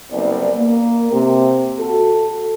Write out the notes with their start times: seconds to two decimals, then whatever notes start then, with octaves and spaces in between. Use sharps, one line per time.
0.12 F#1 C2 B3 D5
0.57 A#3
1.11 C3
1.80 F#4 A4